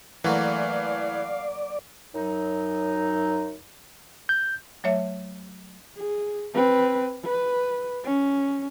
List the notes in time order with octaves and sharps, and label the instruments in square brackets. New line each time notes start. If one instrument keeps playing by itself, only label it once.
[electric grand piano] E3 A3 [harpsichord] F#3 A#3 [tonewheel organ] D5 [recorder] F5
[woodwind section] F#2 F#3 D#4
[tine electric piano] G6
[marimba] F#3 A3 C#5 E5
[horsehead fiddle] G#4
C4 B4
B4
C#4